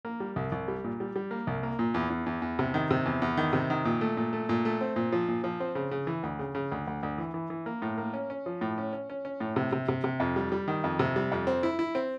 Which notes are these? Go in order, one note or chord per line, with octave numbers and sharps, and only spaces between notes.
A#3
G3
C2
C2
G3
A#2
G3
G3
A#3
C2
A#3
A#2
E2
E2
E2
E2
C3
D#3
C3
E2
E2
D#3
C3
D#3
A#2
A3
A#2
A3
A#2
A3
C4
A#2
F3
A#2
F3
C4
C#3
C#3
E3
D2
C#3
C#3
D2
D2
D2
E3
E3
E3
A#3
A2
A#3
C#4
C#4
F3
A2
C#4
C#4
C#4
C#4
A2
C3
C3
C3
C3
F2
G3
G3
D#3
F2
C3
G3
F2
C4
E4
E4
C4